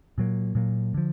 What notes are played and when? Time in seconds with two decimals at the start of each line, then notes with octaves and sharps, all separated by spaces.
0.18 A#2 F#3 A#3
0.55 A#2 F#3 A#3
0.94 D3 F3